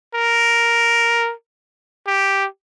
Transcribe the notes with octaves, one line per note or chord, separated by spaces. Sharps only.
A#4
G4